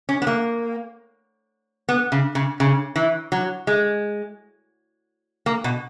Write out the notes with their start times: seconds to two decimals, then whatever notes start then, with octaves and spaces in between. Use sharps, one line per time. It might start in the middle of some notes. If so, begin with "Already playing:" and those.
0.09 C#4
0.22 B3
0.27 A#3
1.89 B3
2.12 C#3
2.35 C#3
2.60 C#3
2.96 E3
3.32 F#3
3.67 G#3
5.46 A#3
5.64 B2